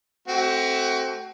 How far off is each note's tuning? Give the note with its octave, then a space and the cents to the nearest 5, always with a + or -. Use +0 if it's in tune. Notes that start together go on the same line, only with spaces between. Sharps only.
A3 +0 C4 +10 F#4 +30